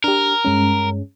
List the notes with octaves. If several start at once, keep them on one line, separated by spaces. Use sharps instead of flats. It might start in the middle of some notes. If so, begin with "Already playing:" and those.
D4 G4 A#4
G2 G#3 C#4